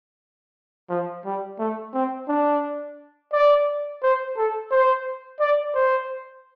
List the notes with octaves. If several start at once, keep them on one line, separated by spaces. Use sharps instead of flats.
F3
G3
A3
C4
D4
D5
C5
A4
C5
D5
C5